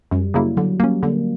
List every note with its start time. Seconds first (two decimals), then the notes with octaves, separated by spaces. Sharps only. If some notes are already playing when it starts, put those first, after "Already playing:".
0.11 F#2 G3
0.34 C#3 F#3 A#3 E4
0.57 D3 F#3
0.80 G3 A#3 C#4
1.03 D3 A#3